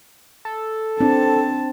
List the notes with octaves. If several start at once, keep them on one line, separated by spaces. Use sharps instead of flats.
A4
C4 D4 A5